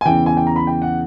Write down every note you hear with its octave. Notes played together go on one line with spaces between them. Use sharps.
G#5
E2 C#3 E3 G5
G#5
G5
A#5
B5
G5
F#5